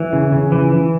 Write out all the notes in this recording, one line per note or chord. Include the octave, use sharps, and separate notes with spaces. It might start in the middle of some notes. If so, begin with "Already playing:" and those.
Already playing: E3
C#3
C#3
E3
E3